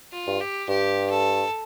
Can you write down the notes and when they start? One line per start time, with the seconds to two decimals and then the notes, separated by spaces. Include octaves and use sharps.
0.12 F4
0.27 G2
0.41 G4
0.68 G2 G4
1.10 A4